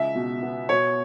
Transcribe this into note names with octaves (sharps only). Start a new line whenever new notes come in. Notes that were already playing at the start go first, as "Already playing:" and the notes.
Already playing: C#2 E5
B2
B3
B2 C#5